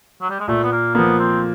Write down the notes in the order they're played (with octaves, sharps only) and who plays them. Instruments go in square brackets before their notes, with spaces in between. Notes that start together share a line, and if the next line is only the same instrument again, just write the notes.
[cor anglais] F#3
G3
G#3
[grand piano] A#2 [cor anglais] A3
[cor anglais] B3
A#3
[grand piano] F3 A#3 [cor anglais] B3
[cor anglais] C4